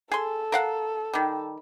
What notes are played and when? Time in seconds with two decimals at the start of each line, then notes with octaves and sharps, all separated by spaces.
0.12 G#4 A4 C6
0.52 A#4 F5 F#5
1.14 D#3 G3